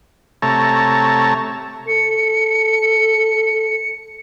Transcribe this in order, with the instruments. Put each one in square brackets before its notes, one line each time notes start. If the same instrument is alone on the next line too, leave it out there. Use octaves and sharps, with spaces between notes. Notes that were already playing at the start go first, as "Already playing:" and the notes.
[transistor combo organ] C3 A3 C#5 A5 A#5
[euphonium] A4 [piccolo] C#7